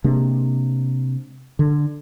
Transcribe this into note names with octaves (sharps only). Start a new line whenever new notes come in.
C3 G#3 A#3 D4
D3